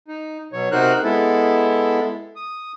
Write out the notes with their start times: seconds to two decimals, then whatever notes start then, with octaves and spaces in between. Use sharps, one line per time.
0.08 D#4
0.53 B2 F#3 C#5
0.72 C3 D#4 F#4 A#4 C5 F#6
1.04 G#3 B3 E4 A4
2.36 D#6